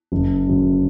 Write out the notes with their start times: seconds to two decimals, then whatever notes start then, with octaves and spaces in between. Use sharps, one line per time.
0.12 F#1
0.47 F#2 D3